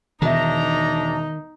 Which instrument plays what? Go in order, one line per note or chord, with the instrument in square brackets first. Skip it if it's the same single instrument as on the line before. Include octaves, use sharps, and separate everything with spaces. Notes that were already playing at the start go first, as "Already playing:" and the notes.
[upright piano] E1 E5 [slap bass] D#3 [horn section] D4 A#5 [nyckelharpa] D#4